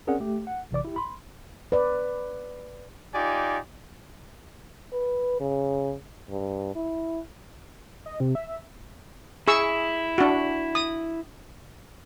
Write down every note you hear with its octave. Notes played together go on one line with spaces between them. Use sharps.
C4 C#4 G#4 A#4 D5 F#5
A3 G4
F#5
A1 C3 E3 D5 D6
E4 G4
B5 C6
B4 D5
D#4 F4 G4 D5 G#5
B4
C#3
G2
E4
D#5
C3
E5
E4 G#4 C#6 E6
D4 F#4
D#6